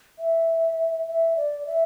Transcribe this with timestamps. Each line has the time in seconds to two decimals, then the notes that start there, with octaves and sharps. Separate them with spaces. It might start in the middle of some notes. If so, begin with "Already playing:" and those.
0.19 E5
1.07 E5
1.37 D5
1.67 E5